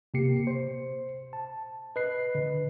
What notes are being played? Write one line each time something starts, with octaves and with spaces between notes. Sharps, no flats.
C3 A#3 G4 C7 C#7
C5
A5
B4 D#5 F#6 C7
D3 B4